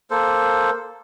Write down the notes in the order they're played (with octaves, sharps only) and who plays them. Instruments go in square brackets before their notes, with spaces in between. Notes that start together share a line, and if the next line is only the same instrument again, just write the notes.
[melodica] A#3 A4 C5